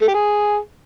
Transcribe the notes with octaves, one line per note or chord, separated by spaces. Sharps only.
A3
G4
G#4